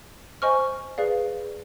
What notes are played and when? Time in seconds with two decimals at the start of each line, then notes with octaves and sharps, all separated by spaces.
0.42 C5 D#5 G#5 C#6 F6
0.98 G#4 B4 D5 F5